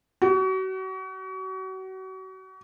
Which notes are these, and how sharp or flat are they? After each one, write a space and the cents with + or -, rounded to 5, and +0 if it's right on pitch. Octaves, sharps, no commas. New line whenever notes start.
F#4 +35